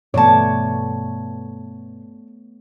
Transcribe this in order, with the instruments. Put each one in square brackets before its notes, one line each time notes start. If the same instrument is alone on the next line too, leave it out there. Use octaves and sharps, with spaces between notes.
[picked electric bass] G2 B2 E3 [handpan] A3 B3 C#5 [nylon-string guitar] D5 A5